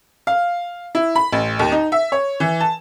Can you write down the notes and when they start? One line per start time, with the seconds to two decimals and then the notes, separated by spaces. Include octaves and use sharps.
0.27 F5
0.95 E4
1.16 B5
1.32 A1
1.59 D#2
1.72 D#4
1.92 E5
2.12 C#5
2.40 E3
2.60 A5